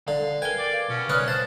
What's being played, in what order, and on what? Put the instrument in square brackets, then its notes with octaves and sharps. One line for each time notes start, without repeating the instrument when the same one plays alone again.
[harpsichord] D3 [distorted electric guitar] F5
[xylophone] A#4 B4 [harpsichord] G5 [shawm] G#5
[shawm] D5
[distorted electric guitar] B2 [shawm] C#4
[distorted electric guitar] C#2 D5 [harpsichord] B4 C#5 [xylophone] D#6 F6 F#6
[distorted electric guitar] C5 [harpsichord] F#5 [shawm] A5